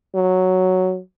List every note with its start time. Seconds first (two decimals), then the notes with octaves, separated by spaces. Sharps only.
0.15 F#3